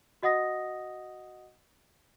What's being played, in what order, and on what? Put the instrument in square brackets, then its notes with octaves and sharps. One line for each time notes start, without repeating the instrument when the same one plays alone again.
[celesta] F#4 D#5 F#5 D#6 A#6